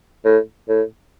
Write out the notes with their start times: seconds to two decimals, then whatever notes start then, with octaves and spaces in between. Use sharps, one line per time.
0.25 A2
0.69 A2